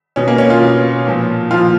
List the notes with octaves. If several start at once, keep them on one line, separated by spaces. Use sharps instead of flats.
B2 C#4
A#3
C#4
F4
B2
A#2 F3
A#2 F3 F4